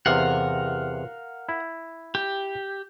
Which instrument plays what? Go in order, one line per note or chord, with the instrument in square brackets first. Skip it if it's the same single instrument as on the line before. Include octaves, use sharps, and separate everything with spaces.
[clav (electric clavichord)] E2 C3 [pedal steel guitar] A#4 F5 F#5
[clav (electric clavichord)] E4
[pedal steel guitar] G4